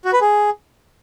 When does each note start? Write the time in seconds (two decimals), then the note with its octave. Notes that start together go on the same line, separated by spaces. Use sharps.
0.05 F#4
0.13 B4
0.21 G#4